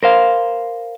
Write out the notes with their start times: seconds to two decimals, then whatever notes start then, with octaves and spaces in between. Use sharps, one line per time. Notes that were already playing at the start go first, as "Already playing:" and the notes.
0.03 A#4 C5 F5